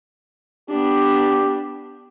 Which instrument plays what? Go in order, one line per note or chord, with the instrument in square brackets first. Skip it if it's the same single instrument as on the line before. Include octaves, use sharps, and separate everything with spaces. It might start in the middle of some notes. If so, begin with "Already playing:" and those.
[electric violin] B3 D4 [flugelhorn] G4